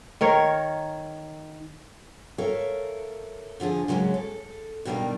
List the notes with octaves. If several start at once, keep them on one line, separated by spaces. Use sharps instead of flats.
D#3 A#4 C#5
A4 A#4 C#5 E5 F5
D3 F3 F4 G#4
C#3 F#3 G#3 A#3 C#4
A4
G2 B2 D#3 G3 A#4 F5